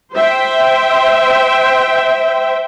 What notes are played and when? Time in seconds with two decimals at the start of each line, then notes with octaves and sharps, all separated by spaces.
0.15 C5 E5 G5